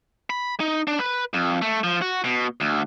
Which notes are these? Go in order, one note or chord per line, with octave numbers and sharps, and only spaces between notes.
B5
D#4
D4
B4
F2
A3
F3
F#4
B2
D2